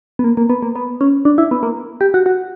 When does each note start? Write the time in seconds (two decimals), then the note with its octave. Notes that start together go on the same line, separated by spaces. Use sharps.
0.19 B3
0.24 A#3
0.37 A#3
0.50 B3
0.63 A#3
0.76 B3
1.01 C#4
1.25 D4
1.38 E4
1.51 B3
1.63 A#3
2.01 G4
2.14 F#4
2.26 F#4